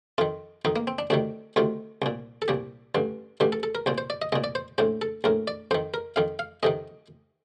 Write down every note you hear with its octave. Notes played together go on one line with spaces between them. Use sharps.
F2 D#3 F4
F2 D#3 D#4
A#3
C4
D4
D2 C3 D#3 D4
D2 C3 D#3 F4
C2 A#2
A4
C2 A#2 G4
A1 G2 D3
A1 G2 D3 G4
A4
A4
A#4
C2 A#2 C5
C5
D5
D#5
C2 A#2 D#5
D5
C5
A#1 A2 C5
A4
A#1 A2 A#4
D5
F2 D#3 C5
A#4
F2 D#3 F5
F5
F2 C3 D#3 D#5